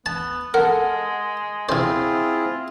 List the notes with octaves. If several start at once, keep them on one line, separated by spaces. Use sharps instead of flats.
B3 A5
G#3 A4 A#4 F#5
C3 C4 E4 F4 G#4 C5